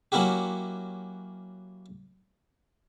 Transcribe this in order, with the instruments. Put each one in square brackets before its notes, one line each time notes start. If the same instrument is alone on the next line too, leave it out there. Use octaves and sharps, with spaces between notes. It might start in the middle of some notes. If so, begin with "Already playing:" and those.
[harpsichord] F#3 A#3 C#4 E4 F#4 G4